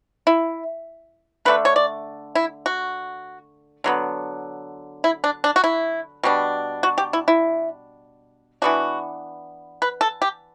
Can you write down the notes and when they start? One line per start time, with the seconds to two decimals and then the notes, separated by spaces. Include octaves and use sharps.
0.27 E4
1.45 D3 A3 D4 B4
1.65 C#5
1.76 D5
2.35 E4
2.66 F#4
3.84 D3 F#3 B3
5.04 E4
5.24 D4
5.44 D4
5.56 F#4
5.64 E4
6.23 B2 G3 D4
6.83 F#4
6.98 G4
7.13 E4
7.28 E4
8.62 E3 B3 D4 F#4
9.82 B4
10.01 A4
10.22 G4